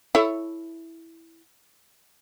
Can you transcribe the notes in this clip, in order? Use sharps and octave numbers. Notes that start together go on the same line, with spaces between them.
E4 A4 C#5